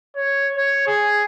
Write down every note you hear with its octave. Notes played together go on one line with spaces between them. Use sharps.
C#5
C#5
G#4